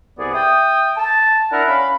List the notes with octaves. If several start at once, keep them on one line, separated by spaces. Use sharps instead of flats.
C2 B3 G#4 D5
E5 G5 D#6
A5
D4 E4 A#4 F#5
C#4 F5 B5